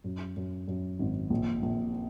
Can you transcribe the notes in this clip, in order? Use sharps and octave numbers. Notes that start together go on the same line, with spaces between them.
F#2
F#2
F#2
G#1
A#1
A#1